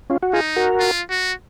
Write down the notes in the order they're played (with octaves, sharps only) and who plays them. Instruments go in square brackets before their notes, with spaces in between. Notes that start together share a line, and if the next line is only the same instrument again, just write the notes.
[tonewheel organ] C#4 F4
F#4
[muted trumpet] D#4 [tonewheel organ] F4 G#4
[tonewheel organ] F#4 A#4
[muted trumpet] F4
F#4